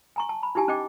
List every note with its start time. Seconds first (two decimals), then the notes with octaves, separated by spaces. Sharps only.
0.16 G#5 A#5 C#6
0.29 A5
0.43 B5
0.55 D#4 E4 G4 G#5 A5
0.68 C#4 D#4 D#5 G5 D6